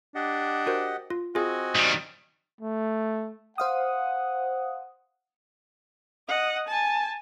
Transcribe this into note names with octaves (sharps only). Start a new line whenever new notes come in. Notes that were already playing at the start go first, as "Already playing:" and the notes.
D4 G4 D#5 F#5
F#4 A#4 C5
F4
C4 F4 F#4 G#4 D#5 G#5
D#3 G3
A3
C5 F5 F#5 D#6
D#5 F#5
G#5 A5